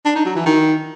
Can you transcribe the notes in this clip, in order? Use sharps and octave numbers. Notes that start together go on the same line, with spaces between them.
D4
D#4
F#3
E3
D#3